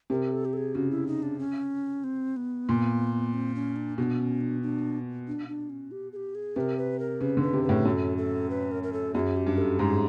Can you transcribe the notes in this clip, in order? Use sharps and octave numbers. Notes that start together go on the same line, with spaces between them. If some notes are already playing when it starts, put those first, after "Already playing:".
C3 A#4
A4
G4
A4
G#4
C#3 F#4
E4
D#4
D4
C#4
C4
B3
A#2
C4
C#4
D4
B2 D4
C#4
D4
D4
D4
D4
C#4
G4
G#4
G4
G#4
C3 A#4 B4
B4
A#4
C#3 B4
D3
B4
C3
B4
A2
F#2 A4
A4
B4
A#4
A#4
A4
F#2 G#4
G4
G2
A#4
A4
G#2 G#4